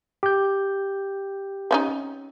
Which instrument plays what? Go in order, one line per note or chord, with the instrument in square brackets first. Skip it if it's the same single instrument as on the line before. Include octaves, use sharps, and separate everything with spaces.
[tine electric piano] G4 G6
[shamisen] C4 C#4 D#4